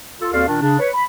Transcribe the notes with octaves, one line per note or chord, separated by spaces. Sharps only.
F4 A4
D#2 C4 F#4 A4 D5 F5
A#2 D#3 D4
C#3 D4
B4 C#5
B5